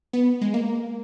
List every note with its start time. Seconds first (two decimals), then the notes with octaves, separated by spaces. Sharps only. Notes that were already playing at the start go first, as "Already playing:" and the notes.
0.13 B3
0.41 G#3
0.54 A#3